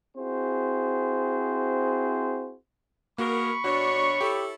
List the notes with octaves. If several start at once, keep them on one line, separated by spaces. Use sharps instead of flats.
C4 E4 F#4 G#4 C5
A#3 B3 F#4 G#4 A#4 B5 C#6
B2 D4 F#4 C#5
E4 G4 A4